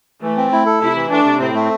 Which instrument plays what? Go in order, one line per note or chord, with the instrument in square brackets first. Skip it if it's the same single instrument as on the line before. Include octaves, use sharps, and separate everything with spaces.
[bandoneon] E3 [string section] A3
[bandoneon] C4
E4
A4
[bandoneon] C3 [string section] E4
[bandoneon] E3
[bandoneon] A3 [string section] D4
[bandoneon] C3
[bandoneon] A2 [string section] C4
[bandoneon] A3